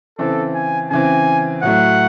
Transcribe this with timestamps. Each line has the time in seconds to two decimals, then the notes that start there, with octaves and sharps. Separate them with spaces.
0.18 C#3 E3 C4 A4
0.55 G#5
0.91 C#3 E3 C4 G#5
1.63 A2 F#3 A3 F#5